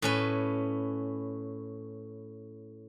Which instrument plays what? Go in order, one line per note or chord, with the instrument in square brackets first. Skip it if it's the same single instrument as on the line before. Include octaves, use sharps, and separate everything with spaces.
[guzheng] A2 C#4 B4